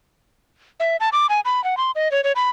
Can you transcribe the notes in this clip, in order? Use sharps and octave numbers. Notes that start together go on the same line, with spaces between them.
E5
A5
D6
G#5
B5
F#5
C6
D#5
C#5
C#5
B5